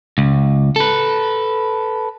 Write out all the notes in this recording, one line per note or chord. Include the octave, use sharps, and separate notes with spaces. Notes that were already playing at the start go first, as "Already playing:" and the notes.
C#2
A4 B4